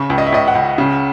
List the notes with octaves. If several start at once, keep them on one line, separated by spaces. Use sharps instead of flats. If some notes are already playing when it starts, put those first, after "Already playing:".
Already playing: C#3 C#6
C#2
D#5
E5
C#2 D#5
F#5
C#2
C#3